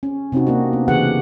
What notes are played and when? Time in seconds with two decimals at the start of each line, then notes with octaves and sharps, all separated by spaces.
0.03 C#4
0.32 C3 C4 C#4 D#4 F#4
0.47 A#3 D4 F#4
0.73 B3
0.88 C#3 E3 G4 F#5